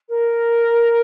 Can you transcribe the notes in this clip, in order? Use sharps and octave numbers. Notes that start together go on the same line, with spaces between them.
A#4